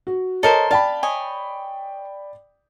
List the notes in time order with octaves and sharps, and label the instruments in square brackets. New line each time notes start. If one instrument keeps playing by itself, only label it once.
[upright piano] F#4
[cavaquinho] A4 A#4 C5 [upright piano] C#5 D#5
[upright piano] D5 G5 B5 [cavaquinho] F5 A5
[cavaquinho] C#5 D#5 G#5